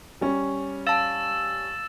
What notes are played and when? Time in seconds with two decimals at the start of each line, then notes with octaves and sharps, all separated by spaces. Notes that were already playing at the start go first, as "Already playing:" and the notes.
0.21 G3 C#4
0.87 F5 A5 E6 A6 E7